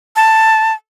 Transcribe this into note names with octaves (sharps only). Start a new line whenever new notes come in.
A5